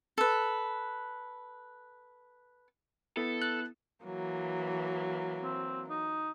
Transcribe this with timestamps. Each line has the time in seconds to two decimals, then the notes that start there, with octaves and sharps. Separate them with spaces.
0.18 A4 B4
3.17 B3 E4 A4
3.42 F#6
4.04 E3 F#3 A#3
5.43 C4
5.90 D#4